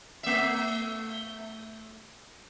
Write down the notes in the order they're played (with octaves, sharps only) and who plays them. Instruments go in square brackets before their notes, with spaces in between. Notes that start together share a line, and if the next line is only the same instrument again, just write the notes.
[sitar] A3 E5